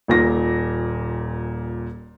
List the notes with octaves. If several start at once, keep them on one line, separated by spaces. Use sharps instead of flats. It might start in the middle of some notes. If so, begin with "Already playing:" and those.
D#1 A#2 A#6